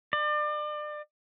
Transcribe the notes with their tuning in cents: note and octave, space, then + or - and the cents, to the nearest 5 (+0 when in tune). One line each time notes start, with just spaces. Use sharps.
D5 +35